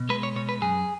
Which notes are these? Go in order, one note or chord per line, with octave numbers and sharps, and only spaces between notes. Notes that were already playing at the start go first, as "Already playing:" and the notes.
Already playing: B2
G#3 B4
C#5
B2 C#5
B4
F#2 G#4